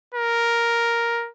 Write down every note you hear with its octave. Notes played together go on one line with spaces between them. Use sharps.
A#4